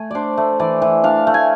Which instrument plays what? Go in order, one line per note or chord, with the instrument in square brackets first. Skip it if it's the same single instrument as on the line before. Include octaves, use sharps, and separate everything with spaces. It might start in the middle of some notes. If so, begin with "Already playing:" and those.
Already playing: [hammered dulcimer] A3 G#5
D4 C5 D5
A3
E3 D5
E3
D4 F5
A3
G#5